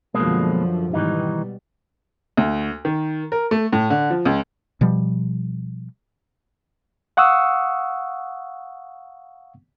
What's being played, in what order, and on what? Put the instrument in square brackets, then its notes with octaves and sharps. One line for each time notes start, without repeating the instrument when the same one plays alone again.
[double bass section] F#2 D3 F3 [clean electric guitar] B2 G#3 A#3
[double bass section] G#2 B2 G3 [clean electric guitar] D#3 E3 D#4
[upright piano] D2
D#3
A#4
A3
A2
D3
F3
C#2
[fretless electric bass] B2 F3 G3
[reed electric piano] F5 F#5 C#6 D#6 E6